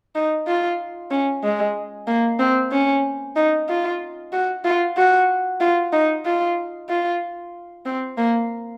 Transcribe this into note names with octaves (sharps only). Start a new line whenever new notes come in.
D#4
F4
C#4
G#3
A#3
C4
C#4
D#4
F4
F#4
F4
F#4
F4
D#4
F4
F4
C4
A#3